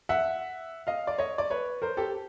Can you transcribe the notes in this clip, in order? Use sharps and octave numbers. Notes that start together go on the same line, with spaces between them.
E5 F#5
D#5 F5
D5
C#5 D#5
D5
B4 C#5
A#4 C5
G4 A4